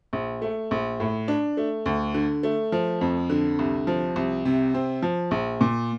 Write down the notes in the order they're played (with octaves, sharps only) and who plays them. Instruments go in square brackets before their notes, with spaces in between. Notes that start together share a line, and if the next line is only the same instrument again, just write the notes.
[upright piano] A#1
A3
A#1
A2
D4
A3
D2
D3
A3
F3
F2
D3
C2
F3
C2
C3
C4
F3
A#1
A#2